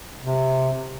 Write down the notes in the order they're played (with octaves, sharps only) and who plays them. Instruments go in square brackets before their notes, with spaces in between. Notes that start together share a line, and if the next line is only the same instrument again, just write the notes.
[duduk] C3